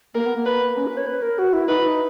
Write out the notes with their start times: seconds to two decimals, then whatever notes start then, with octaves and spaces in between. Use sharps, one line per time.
0.15 A#3 A#4
0.26 B3
0.36 A#3
0.46 B4
0.77 C#4
0.87 B4
0.97 C#5
1.07 B4
1.22 A#4
1.38 F#4
1.53 E4
1.68 D#4 B4
1.84 D#4